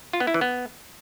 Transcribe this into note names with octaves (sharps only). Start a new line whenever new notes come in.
F4
B3
E4
E3
B3